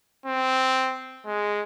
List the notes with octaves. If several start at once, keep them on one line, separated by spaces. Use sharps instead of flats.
C4
G#3